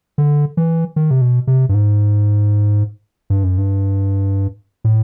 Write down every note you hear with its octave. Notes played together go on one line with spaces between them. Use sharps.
D3
E3
D#3
C3
B2
C3
G2
G#2
G2
F#2
G2
A2